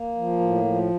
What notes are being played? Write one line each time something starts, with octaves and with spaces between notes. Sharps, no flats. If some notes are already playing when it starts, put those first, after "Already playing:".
Already playing: A#3
F3
A2
F3